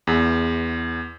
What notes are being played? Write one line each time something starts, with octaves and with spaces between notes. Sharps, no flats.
E2